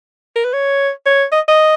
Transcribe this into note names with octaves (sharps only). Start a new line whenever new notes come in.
A#4
B4
C#5
C#5
D#5
D#5